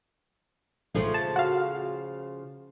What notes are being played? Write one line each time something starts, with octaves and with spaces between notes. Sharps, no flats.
A#1 G#2 C#3 F3 A3
A5
F#4 F5